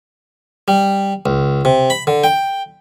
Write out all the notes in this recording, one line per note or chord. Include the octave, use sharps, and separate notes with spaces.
G3
C#2
C3
B5
D3
G5